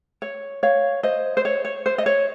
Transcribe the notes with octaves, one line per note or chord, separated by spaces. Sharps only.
C#5
C#5 F5
C5 D#5
C5
C#5
C#5
C5
D#5
C#5